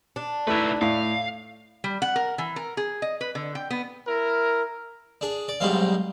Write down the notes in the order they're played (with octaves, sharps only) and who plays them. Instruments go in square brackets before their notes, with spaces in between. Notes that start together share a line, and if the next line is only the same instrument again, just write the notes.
[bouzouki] D4
[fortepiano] A3 E4 [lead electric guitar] D#4 B4
[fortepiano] A2 [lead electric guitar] F5
[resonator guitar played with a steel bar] G3
F#5
A#4
E3
A#4
G#4
D#5
B4
D3
G5
B3
[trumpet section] E4 A#4
[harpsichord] D4 G#4
D5
B1 G#2 B2 G3 C4 F5